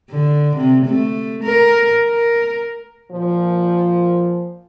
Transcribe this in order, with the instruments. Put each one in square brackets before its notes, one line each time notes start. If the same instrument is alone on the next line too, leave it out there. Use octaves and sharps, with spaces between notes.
[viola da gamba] D3
C3
A3
A#4
A#4
[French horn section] A#2 F3